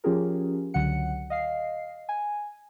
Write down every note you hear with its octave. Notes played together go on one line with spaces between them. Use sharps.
F3 C#4 F4 G4 G#4 A#4
C#2 D3 F#3 F#5 C#7
D#5 F5 C7
G#5